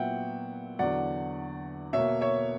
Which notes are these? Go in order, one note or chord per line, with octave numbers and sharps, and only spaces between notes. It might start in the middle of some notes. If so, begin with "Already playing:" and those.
Already playing: A#2 F#3 B3 E5 F#5 G5
E2 D3 F#3 D5 F#5
B2 A#3 C#5 E5
C#5 E5